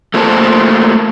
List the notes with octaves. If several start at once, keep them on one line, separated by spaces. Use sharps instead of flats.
A3 A#3 F4 A#4 C5 A5